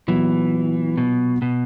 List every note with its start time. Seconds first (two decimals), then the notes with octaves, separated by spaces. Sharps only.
0.07 A#2 E3 F#3 B3
0.98 B2
1.42 B2